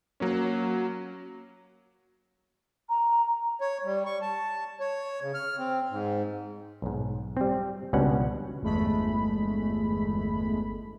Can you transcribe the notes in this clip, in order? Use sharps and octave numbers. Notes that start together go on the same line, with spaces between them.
F#3 A#3 C#4
A#5
C#5
G3
C#6
A5
C#5
C#3
F6
C4
G#2
B1 G#2
G3 C4
C#2 B2 G3 C#4 D4 F#5
G1 E2 G#3 A3 B5